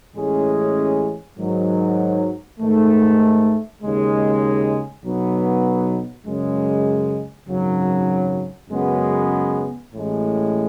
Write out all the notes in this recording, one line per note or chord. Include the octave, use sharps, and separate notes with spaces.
A1 A2 G#3 C#4 G#4
G#2 D#3 F#3
G#2 D#3 A3
D#2 C#3 G#3
B1 B2 F#3 B3
F#2 C#3 G#3
G#1 F#2 C#3 F#3
F#2 C#3 G#3 B3 F#4
A1 A2 G#3